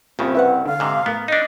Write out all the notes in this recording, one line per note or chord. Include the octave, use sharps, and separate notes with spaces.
C2 G2 A#2 C#3 C4
E4 B4 F#5
D3 F5
G#2 C3
A2 B3 A#4
D4 D#4 D#5